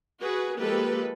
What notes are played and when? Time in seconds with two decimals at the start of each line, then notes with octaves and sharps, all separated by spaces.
0.20 F#4 G#4 B4
0.58 F3 G#3 A#3 G4 A4 B4